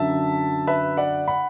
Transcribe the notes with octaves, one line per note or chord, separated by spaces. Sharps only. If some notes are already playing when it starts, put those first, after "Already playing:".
Already playing: F#2 D3 F#3 E5 A5
B4 E5
D5 F#5
F#5 B5